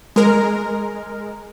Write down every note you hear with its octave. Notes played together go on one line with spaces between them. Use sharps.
G#3 A#4